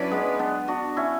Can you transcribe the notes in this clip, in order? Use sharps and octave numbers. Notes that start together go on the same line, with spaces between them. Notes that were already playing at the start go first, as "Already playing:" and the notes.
Already playing: F#3 C#4 D4 E4 B4 D5
G#3 B3
B3 D4
D4 F#4
C#4 E4